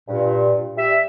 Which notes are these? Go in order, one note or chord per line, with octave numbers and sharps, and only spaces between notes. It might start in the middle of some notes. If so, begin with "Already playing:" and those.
G2 A#2
G3 E5